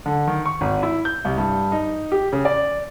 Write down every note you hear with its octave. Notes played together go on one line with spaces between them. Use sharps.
D3
D#3
C#6
G#1
E4
G6
C2
G2
D#4
G4
C#3
D5